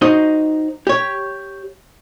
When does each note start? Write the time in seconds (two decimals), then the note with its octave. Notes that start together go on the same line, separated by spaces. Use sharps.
0.02 D#4 F#4 C5 D#5
0.87 G4 C#5